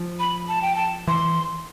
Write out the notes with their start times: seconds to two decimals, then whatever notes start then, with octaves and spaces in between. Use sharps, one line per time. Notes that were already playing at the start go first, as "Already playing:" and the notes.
Already playing: F3
0.20 B5
0.48 A5
0.62 G5
0.76 A5
1.07 E3 C6